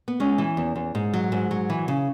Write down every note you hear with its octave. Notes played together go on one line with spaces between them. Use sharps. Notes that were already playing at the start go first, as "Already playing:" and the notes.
B3
G#3 C#4
E3
E2
E2
G#2
F#3
G#2
F#3
E3
C#3